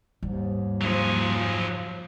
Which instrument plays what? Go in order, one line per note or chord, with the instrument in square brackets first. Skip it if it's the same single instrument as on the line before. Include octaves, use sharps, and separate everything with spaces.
[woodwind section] D#2 G#2 [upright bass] G3
[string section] F3 [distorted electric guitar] F#3 G#4